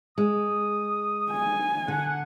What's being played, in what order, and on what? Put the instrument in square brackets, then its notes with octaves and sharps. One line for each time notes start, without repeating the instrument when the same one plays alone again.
[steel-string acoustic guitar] G#3 [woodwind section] D#6
[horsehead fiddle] G#5
[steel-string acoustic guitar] D3 [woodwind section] F#5